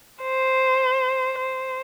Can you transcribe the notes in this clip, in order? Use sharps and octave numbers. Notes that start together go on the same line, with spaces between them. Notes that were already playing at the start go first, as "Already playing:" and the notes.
C5
C5